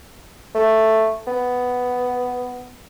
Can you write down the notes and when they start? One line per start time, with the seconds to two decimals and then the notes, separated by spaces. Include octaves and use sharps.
0.55 A3
1.27 B3